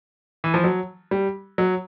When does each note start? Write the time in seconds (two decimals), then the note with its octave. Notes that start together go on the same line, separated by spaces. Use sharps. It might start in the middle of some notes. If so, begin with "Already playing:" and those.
0.44 E3
0.54 F3
0.64 F#3
1.11 G3
1.58 F#3